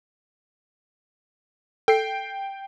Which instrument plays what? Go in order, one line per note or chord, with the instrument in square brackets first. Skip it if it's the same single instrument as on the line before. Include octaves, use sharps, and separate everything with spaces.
[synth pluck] A4 [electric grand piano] G5 C7